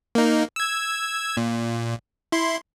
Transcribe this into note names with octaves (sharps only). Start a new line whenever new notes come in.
A#3 D#4
E6 G#6
A#2
E4 C6